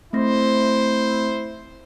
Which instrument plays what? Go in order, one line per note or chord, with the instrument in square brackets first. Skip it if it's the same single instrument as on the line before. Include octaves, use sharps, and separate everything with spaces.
[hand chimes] A3 C4 A#6 [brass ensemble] E4 C5